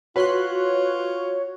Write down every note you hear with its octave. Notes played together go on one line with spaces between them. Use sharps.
F4 F#4 B4 C#5 C6 F#6